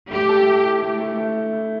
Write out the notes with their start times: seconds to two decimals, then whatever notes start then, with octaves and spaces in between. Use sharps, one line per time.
0.10 A3 G4
0.29 A4
0.46 E4
0.64 E4
0.82 A3
1.00 A3
1.17 A3
1.35 E4
1.53 E4